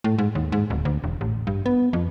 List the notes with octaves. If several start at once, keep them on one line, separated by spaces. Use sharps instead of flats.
A2
G#2
D#2
G#2
D1
D2
E1
A1
G2
B3
F2